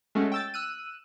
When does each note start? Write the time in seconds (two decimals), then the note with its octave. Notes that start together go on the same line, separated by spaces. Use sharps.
0.15 G#3 A3 C#4 F#4
0.32 G5 E6 A6
0.54 E6 F#6 D#7